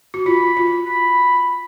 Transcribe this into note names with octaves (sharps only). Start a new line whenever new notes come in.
F#4
F4 B5
F4
B5